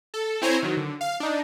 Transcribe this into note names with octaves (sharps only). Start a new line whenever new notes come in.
A4
C4 E4 C5 C#5 G#5 A#5
D#3 F#3
D3
F5
D4 D#4